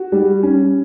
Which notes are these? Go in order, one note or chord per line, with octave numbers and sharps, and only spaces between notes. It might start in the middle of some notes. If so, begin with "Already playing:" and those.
Already playing: F#4
G3
C#4